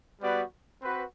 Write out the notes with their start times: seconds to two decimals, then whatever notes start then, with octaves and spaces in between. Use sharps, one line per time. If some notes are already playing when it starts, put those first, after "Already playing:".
0.21 G3 B3 F#4 B4 D5
0.82 C4 F#4 B4